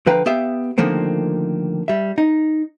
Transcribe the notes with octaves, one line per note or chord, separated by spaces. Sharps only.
D3 F3 B4 F5 G5 A#5
B3 G4 E5 F5
D3 D#3 F3 A3 A#3 C4
G3 E5
D#4